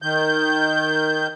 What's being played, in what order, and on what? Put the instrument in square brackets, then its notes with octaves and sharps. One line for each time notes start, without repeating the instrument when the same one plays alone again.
[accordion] D#3 G6